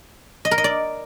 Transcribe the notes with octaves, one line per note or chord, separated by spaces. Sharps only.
D#5
A#4
D#5
D5